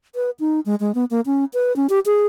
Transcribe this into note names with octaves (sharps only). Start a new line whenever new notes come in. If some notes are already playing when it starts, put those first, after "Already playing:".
B4
D#4
G#3
G#3
B3
A#3
C#4
B4
C#4
G4
G#4